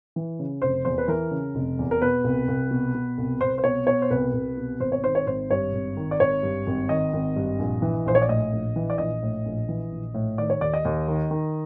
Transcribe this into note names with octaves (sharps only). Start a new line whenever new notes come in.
E3
C#3
F1 C5
E2 C5
B4
E3 A#4
C#3
F1
E2
A#4
B2 B4
C2
C2
B2
B2
C2
C2 C5
C5
B2 C#5
B2 C#5
C5
C2 B4
C2
B2
G#1 C5
C#5
D#3 C5
C#5
G#1 C5
G2 C#5
G#1
D#3
D5
G#1 C#5
G2
G#1
D#3 D#5
G#1
G2
A#1
E3
A#1 C5
C#5
D5
A2 D#5
A#1
E3
D5
A#1 D#5
A2
A#1
E3
A#1
A2
D#3 D5
C#5
D#2 D5
D#5
D#2
D#3
D#3